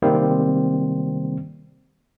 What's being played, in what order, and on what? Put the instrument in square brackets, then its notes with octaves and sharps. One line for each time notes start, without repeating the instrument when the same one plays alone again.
[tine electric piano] C3 D#3 G3 A#3 C4